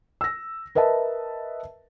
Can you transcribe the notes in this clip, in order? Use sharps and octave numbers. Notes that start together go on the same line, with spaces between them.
E6 A#6
A#4 B4 D#5 E5 A5